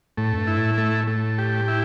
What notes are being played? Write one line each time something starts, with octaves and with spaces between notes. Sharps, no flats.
A2 A3
F2
G2
E4
A2
A3
A3
G4
E4